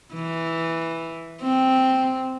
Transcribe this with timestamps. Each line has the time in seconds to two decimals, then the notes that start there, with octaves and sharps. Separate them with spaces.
0.13 E3
1.42 C4